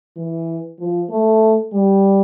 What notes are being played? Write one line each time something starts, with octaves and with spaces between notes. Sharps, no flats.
E3
F3
A3
G3